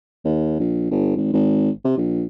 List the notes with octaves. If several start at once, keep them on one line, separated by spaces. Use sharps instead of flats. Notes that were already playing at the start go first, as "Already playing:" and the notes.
D#2
A#1
G1
G#1
G#1
C3
A#1